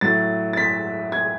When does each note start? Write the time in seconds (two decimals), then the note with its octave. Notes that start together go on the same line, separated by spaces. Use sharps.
0.01 A2 F#3 A3 A6
0.53 A6
0.57 B6
1.12 G#6